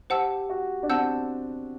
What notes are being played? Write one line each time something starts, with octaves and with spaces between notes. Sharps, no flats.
G4 C5 F#5 A5 E6
F#4
D4
C4 F#5 A5 E6 G6